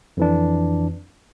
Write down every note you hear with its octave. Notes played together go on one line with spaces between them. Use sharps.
F2 E3 D4